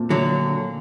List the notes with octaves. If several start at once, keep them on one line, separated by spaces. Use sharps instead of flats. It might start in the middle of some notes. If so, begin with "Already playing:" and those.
Already playing: A#2 A3 C4
D3 F#3